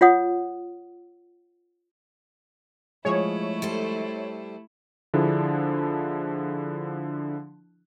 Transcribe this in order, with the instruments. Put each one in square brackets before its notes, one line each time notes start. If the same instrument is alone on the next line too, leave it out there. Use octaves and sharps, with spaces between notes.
[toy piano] F4 C#5 F#5 D#6
[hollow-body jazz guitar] F3 G#3 G#4 [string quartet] A3 E4 [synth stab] C#5
[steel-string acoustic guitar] G3 A4 C5
[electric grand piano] D3 F3 D4 E4 G#4